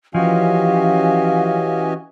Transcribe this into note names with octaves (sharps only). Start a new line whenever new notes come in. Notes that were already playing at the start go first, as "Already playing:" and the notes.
E3 F3 C#4 F#4 G4 D#5 F5 G#5